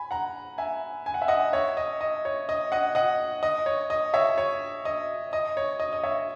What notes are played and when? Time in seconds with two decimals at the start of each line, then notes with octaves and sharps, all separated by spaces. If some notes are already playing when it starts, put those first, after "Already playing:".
Already playing: G#5 B5
0.11 F#5 A#5
0.58 E5 G#5
1.06 G#5
1.14 F#5
1.22 E5
1.28 D#5 F#5
1.53 C#5 E5
1.77 D#5
2.01 D#5
2.25 C#5
2.49 D#5
2.72 D#5 F#5
2.95 D#5 F#5
3.43 D#5
3.66 C#5
3.90 D#5
4.14 C#5 E5
4.38 C#5
4.85 D#5
5.33 D#5
5.57 C#5
5.80 D#5
5.93 D#5
6.03 C#5 E5